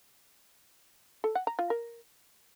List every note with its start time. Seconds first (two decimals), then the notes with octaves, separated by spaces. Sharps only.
1.24 A4
1.35 F#5
1.47 A#5
1.59 F4
1.70 A#4